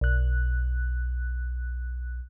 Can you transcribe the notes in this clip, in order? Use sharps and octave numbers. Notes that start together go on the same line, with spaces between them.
B1 F#6